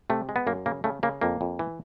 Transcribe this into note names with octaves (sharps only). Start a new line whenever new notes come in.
C3 A3
G#3
B3
F#2 A#3
C#3 A#3
C#3 A3
C#3 A#3
F2 A#3
F2
E3